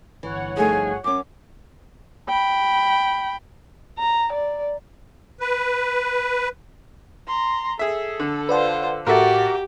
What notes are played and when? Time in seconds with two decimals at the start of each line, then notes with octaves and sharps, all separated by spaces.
0.23 G1 E3 C#5 F#5
0.57 F3 A3 D#4 G#4
1.04 F#2 C#4 D6
2.28 G5 B5
3.98 A#5
4.33 D5
5.40 B4
7.27 A#5 C6
7.79 G#4 A4 E5
8.20 D3
8.49 F4 B4 C5 D5 F#5
9.07 A2 F#4 G4 A4 A#4 E5 D6 A6